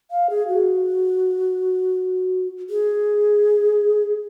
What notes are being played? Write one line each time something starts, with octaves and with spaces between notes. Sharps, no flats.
F5
G#4
F#4
G#4